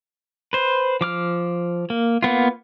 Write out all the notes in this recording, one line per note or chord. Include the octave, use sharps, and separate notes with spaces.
B4 C5
F3 D6 F6
A#3
A#3 B3 F4